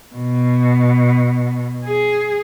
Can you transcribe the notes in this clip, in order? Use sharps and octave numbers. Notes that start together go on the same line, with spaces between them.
B2
G#4